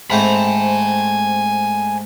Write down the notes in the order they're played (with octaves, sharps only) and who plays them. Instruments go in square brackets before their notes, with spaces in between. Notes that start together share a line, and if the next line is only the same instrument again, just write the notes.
[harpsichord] G#2 A3 C4 [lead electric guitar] G#5 B5